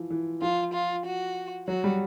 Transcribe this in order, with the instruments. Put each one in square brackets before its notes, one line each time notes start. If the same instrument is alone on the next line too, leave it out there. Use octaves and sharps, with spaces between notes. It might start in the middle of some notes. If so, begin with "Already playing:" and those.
Already playing: [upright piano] E3 F3
E3
[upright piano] F3 [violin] F4
[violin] F4
F#4
[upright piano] F#3 [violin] F#4
[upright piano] G3